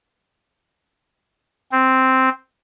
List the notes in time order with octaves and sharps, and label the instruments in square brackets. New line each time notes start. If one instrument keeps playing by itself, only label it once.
[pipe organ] C4